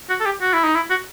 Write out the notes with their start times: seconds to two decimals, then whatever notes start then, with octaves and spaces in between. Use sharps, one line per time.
0.10 F#4
0.20 A4
0.26 G4
0.42 F#4
0.53 E4
0.64 D#4
0.75 E4
0.90 F#4